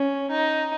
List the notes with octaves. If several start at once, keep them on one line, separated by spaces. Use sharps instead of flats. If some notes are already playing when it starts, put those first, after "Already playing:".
Already playing: C#4
D#4